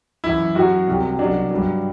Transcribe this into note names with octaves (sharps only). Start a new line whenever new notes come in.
F#2 E3 E4
F#2 F#3 F#4
C2 C3 F#3
C2 B2 F#3 D4
G2 F#3